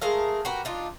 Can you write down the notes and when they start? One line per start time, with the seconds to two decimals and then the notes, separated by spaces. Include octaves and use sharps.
0.01 G#3 A3 A#4 F5
0.45 F#4 G4 A#4 B4
0.65 D4 D#4 F4